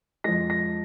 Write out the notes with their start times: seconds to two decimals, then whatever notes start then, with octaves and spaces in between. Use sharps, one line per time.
0.24 F2 F3 G#3 A#6
0.50 A#6